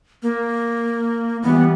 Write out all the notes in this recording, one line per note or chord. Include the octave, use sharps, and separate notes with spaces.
A#3
E3 G3 B3